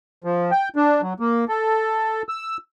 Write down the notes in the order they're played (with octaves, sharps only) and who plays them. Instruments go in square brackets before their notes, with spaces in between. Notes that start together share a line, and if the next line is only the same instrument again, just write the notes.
[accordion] F3
G5
D4
F#3
A#3
A4
E6